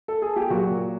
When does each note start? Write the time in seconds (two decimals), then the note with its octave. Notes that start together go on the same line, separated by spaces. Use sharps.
0.08 A4
0.22 G#4
0.36 G4
0.50 A#2 F#3 F#4